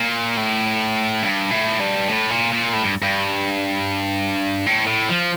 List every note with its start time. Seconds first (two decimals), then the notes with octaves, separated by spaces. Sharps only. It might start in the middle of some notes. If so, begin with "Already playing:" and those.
Already playing: A#2
0.37 A2
1.23 G2
1.51 A2
1.80 G2
2.08 A2
2.30 A#2
2.52 A#2
2.73 A2
2.83 G2
3.02 G2
4.67 A2
4.87 A2
5.09 F3